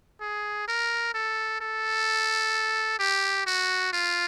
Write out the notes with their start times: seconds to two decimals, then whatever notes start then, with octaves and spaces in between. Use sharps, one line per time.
0.21 G#4
0.68 A#4
1.14 A4
1.61 A4
2.99 G4
3.47 F#4
3.93 F4